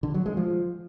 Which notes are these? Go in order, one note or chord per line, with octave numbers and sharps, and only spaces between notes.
D3
F#3
G#3
F3